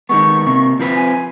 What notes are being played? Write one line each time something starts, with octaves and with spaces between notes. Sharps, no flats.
D#3 G#3 B3 C#6
C3 A#3
F3 C4 B4
G#5